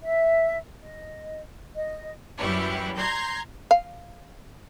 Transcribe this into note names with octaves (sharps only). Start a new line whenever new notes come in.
E5
D#5
D#5
F#2 E3 G3 E4 G4 C#7
A#5 C6 G6 G#6 A#6 C7
F5